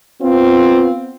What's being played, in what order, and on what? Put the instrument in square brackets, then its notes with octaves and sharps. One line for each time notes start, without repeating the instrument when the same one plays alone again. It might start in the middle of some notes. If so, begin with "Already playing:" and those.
[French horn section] B3 C4 F4